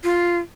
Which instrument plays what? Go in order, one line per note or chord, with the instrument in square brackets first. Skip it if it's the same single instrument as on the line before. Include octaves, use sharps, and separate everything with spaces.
[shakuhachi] F4